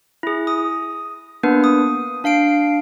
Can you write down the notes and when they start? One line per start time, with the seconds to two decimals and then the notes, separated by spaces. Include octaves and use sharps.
0.23 E4 G#4
0.47 D#6
1.43 A#3 B3 D4 B4
1.64 D#6
2.24 D4 F5 C7 D7